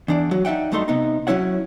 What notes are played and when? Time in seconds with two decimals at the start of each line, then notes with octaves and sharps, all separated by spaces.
0.08 E2 D4 D5
0.31 F#3 F#4
0.45 D#4 D5 E5 F#5 G5
0.72 G2 F#3 A3 D#4 A4 C6
0.88 C3 B3 D#4
1.27 F#3 C#4 E4 C#5 F#5